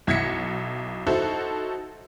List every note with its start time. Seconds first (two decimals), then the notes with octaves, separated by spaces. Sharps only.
0.07 B1 E4 G#6 A#6 B6 C#7
1.07 D#4 E4 F#4 A4 C5